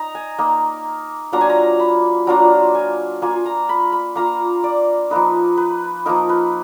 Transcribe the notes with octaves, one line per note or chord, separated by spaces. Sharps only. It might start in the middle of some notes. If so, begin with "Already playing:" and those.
Already playing: D#4 A#5
G#5
A#3 D#4
F#3 A#3 D4 F4 A#5
G#5
A#5
B5
F#3 A#3 D4 F4 A#5
G#5
A#3 F4 G#5
A#5
B5
B5
A#3 F4 A#5
D5
F3 A#3 D#4 B4
B4
F3 A#3 D#4 A#4
B4